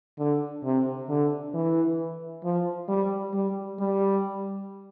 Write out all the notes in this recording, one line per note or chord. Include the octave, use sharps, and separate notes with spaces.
D3
C3
D3
E3
F3
G3
G3
G3